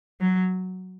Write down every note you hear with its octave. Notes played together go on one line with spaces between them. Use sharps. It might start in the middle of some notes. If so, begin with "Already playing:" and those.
F#3